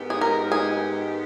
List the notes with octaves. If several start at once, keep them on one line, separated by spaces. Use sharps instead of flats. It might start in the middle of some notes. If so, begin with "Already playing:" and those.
Already playing: G#2 D#3 G#3 B3 G4
G#4
A#4
G#4